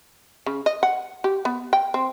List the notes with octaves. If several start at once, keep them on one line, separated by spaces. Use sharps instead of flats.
C#3
D#5
F#5
G4
B3
G5
C4